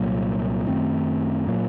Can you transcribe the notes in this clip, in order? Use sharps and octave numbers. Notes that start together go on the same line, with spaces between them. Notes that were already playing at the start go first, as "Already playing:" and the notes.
Already playing: C2 A#2 F#3 A#3
F#2 D#3 A3 C4
A#2 F#3 A#3